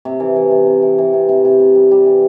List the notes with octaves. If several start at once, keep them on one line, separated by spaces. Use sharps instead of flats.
C3
E3
E3
C3
C3
E3
E3
C3
C3
C3
C3
G3
G3
E3